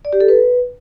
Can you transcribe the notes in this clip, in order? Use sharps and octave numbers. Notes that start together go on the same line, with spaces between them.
D5
G4
A4
B4